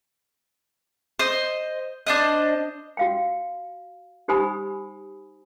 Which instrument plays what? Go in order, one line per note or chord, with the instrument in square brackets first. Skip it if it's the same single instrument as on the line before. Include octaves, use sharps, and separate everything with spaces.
[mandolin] C5 D#5
D4 C5 D#5
[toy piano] F#4 F5 G5
D#4 G4 C5 G#5 B5 D#6